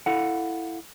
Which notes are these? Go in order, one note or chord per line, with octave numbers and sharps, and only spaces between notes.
E4 A4 F5 F#5